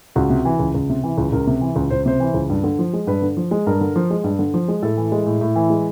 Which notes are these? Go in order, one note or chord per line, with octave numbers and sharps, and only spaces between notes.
C#2 F#4
C3
E3
C#2
C#2
C3
E3
C#2
C#2 A#4
C3
E3
C#2
C#2 C5
C3 C5
E3
C#2
G2
D3
F3
G#3
G2 B4
D3
F3
G#3
G2 A#4
D3
F3
G#3
G2
D3
F3
G#3
A2 A4
E3
G#3
A2
A2
E3
G#3